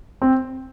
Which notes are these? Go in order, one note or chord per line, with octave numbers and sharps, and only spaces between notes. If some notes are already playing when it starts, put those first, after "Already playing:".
C4